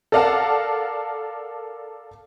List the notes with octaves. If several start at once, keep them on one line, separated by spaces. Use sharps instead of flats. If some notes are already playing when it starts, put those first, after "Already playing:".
A4 A#4 D5 F5 F#5 A5